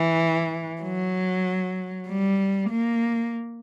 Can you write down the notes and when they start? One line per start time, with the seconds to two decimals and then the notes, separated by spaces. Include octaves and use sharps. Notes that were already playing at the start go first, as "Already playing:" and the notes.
Already playing: E3
0.81 F#3
2.08 G3
2.71 A#3